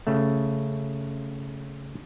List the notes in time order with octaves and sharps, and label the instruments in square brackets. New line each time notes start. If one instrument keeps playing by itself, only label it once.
[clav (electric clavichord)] C#3 A3